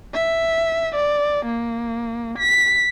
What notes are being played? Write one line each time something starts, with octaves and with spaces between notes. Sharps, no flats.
E5
D5
A#3
B6